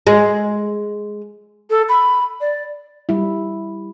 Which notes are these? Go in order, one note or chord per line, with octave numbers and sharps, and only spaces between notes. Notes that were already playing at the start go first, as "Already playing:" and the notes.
G#3
A4
B5
D5
G3 E4